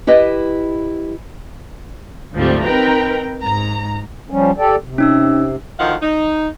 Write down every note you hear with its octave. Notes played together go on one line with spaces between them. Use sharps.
E4 G4 B4 D#5
D2 G#2 F3 G3 A3 C4
C4 D#4 A#4 B4 G5 A#5
G#2 A#5
F3 G3 C#4
G4 A4 D5
C3
C#4 D#4 E6
D2 D#3 F3 F5 F#5
D#4